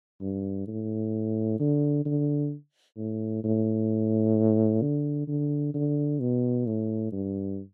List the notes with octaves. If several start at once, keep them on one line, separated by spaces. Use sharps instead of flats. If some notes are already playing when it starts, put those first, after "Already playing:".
G2
A2
D3
D3
A2
A2
D3
D3
D3
B2
A2
G2